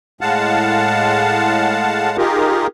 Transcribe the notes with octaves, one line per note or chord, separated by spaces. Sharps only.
A2 G#3 F5 F#5 A5
D#4 F4 G4 G#4 A#4